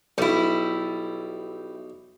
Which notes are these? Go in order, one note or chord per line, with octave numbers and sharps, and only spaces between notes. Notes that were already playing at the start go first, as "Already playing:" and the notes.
B1 G3 E4